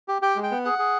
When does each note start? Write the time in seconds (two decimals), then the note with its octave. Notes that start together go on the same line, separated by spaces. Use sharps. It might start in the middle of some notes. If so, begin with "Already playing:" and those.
0.08 G4
0.22 G4 G5
0.36 G#3
0.43 G5
0.51 B3
0.65 G#4 F#5
0.79 G#4